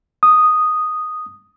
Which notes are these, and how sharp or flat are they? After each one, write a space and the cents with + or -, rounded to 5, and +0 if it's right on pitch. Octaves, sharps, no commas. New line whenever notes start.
D#6 -5